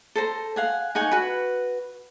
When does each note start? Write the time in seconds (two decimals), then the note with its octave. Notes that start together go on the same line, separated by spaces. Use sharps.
0.16 A4 C5 A#5
0.56 F5 F#5 G#5
0.95 D#4 F#5 G#5 C#6
1.11 F#4 B4